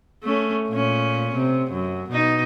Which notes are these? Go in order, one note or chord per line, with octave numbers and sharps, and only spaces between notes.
A3 C#4
A#2 C#4
C3
F#2
B2 D#4